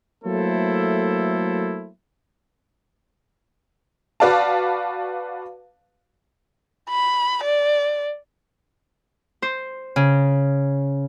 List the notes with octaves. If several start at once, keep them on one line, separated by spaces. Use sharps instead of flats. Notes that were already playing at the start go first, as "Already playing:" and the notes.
F#3 A3 A#3 E4 A4 C5
F#4 B4 D5 F5 A5
B5
D5
C5
C#3